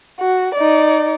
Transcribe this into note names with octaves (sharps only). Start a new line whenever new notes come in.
F#4
D#4 D5